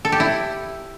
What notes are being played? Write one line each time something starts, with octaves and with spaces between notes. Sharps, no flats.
A4
G4
E4